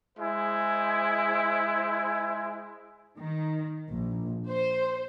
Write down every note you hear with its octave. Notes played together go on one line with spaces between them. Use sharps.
G#3 E4 C5 G#5
D#3
A#1
C5